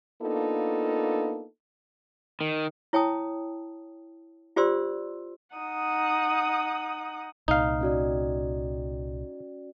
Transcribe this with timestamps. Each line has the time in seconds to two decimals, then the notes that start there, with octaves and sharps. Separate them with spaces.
0.22 A#3 B3 D4 D#4 F4 A4
2.41 D#3
2.93 E4 C#5 G5 A5 D#6
4.56 F4 G4 C5 D5 C6 E6
5.56 D#4 F#5 D#6
7.48 C2 A#2 D#4 F5
7.81 C#4 F#4 D5